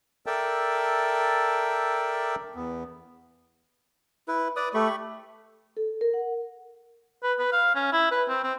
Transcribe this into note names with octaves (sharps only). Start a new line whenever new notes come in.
A4 A#4 D5 E5 G5 A5
E2 B3
E4 B4
B4 D5 D#6
A3 G4 B5 C#6
A4
A#4
F#5
B4
B4
F5
C#4
E4
B4
C4
C4